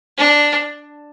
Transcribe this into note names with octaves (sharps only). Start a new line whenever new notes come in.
D4